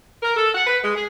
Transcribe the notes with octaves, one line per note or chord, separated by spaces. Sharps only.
A#4
A4
F#5
B4
G#3
G#4